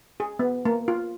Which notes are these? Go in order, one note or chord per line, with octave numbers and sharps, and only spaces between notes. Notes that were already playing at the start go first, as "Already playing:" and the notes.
G#4
B3
A#3
F4